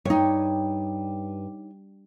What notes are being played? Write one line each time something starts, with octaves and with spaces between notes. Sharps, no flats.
G2 D#4 C#5